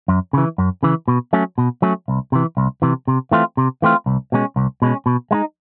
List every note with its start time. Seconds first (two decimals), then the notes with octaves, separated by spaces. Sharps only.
0.08 F#2
0.33 C#3 E3
0.58 F#2
0.83 C#3 E3
1.08 B2
1.33 F#3 A3 C#4
1.58 B2
1.82 F#3 A3 C#4
2.08 C2
2.32 C3 E3
2.57 C2
2.82 C3 E3
3.08 C3
3.32 E3 A3 C4 F4
3.57 C3
3.82 E3 A3 C4 F4
4.06 C2
4.32 B2 G#3 C#4
4.56 C2
4.82 B2 G#3 C#4
5.06 B2
5.31 G#3 B3 D#4